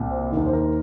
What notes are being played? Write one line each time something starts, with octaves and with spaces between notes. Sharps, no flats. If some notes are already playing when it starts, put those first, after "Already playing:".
Already playing: C2 A#2
C5
D#3
D#2
C5
A#4